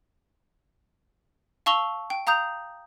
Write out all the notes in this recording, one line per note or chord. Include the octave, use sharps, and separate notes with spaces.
F5 A5 C#6 E6 F7 G7
G5
F5 A#5 D#6 G6 F7